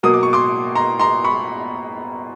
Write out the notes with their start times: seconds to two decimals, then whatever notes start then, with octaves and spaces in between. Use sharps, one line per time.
0.03 B2 F#3 A#3 D#6
0.14 D6
0.23 C#6
0.33 C6 D6
0.75 A#5 C6
1.00 A#5 C6
1.24 B5 C#6